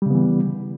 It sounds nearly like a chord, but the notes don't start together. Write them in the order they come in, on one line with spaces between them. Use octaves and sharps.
G3 C#3 B3 E3